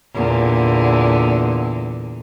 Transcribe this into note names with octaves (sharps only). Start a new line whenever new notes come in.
E2 A#2 D3